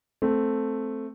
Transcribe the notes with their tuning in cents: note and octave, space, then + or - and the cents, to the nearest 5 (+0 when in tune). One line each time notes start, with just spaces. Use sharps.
A3 +0 C4 +0